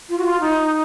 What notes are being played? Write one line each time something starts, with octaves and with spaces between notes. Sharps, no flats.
F4
F#4
F4
D#4